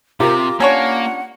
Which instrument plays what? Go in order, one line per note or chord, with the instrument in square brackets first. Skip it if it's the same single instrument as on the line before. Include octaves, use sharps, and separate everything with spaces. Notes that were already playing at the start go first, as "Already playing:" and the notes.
[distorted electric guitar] C3 [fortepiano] F4 G4 A#4 [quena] D6
[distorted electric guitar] A#3 [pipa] C#4 D4 C#5 [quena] F#5